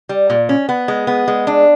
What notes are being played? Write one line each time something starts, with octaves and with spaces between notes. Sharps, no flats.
G3
A#2
C#4
B3
G#3
B3
G#3
D4